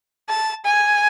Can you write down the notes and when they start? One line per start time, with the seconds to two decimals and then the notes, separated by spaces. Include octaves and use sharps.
0.29 A5
0.65 G#5